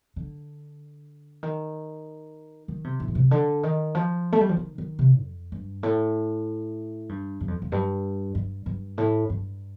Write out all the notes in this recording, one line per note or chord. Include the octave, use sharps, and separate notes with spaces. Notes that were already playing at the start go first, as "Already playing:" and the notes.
D3
D#3
D#3
C3
A2
D3
C3
D3
D#3
F3
A3
G3
F3
D#3
D#3
C3
F2
G2
A2
G2
G2
F2
F2
G2
G2
G2
A2
G2